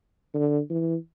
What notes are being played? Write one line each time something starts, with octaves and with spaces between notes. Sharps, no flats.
D3
E3